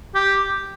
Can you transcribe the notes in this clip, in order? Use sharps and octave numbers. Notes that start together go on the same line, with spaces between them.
G4